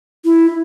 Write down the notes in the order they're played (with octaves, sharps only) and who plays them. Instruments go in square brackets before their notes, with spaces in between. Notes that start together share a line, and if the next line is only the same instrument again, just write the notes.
[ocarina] E4